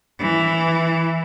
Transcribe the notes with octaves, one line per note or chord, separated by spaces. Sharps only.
E3